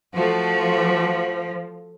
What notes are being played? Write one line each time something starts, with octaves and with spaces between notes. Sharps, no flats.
F3 A3 F#4